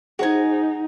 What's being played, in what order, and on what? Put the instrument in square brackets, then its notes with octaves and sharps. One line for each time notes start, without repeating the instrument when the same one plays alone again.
[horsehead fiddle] D#4 [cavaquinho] F#4 G#5 [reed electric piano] G#4 C5